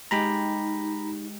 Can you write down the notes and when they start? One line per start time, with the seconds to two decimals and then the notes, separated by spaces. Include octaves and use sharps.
0.11 G#3 D#4 G4 A#5 B5